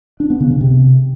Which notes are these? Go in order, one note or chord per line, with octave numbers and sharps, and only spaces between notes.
D4
B3
C#3
C#3
C3